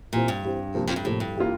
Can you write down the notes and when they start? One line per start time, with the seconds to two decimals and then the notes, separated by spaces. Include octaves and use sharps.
0.12 A#2 E3 G3 C4
0.28 G2
0.43 E3 G3 C4
0.74 C3 F3 A#3
0.88 F2
0.96 G2
1.04 A2 C3 F3 A#3
1.20 G2
1.36 E3 G3 A#3 F4